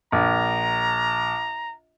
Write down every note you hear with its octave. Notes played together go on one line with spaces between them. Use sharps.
A#1 A#5